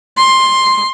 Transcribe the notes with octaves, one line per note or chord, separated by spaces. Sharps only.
C6